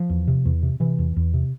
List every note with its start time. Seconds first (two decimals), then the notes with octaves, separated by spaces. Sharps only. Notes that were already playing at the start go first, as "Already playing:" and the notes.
Already playing: F3
0.10 E2
0.28 C3
0.45 E2
0.63 C3
0.80 C3 E3
0.99 E2
1.16 E2
1.34 C3